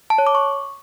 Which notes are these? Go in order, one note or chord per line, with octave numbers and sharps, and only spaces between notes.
A5
C#5
D6
C#6